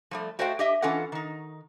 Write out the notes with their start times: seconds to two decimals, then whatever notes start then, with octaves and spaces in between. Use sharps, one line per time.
0.11 F3 G3 A3
0.39 A3 F#4 C5 D#5 F5 G5
0.59 G4 D#5 E5
0.82 E3 C#4 F4 A4 D#5 F#5
1.12 D#3 D#4